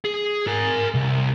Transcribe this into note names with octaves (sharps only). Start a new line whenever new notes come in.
G#4
A#4 G#5
C2